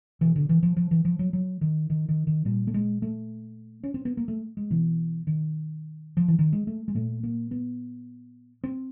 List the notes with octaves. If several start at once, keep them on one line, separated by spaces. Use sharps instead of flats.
B2 E3
D3
E3
F3
F3
E3
F3
F#3
F#3
D#3
D#3
D#3
D#3
A#2 G3
A3
G#3
A3
C#4
C4
B3
A#3
A3
G#3
B2 E3
D#3
F3
E3
D#3
G#3
A3
G#3
A#2 A3
A#3
B3
C4